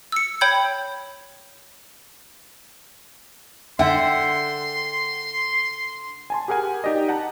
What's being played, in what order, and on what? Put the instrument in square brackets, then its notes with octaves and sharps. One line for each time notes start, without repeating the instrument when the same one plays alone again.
[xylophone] E6 C#7
C#5 G5 B5 G6 G#6
[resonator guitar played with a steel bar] D3 [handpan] E5 [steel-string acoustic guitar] F#5 G5 [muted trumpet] C6
[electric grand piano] G#5 A5 C6
G4 G#4 A#4 F#5 G#5
D#4 G4 D5 D#5
F#5 A5 A#5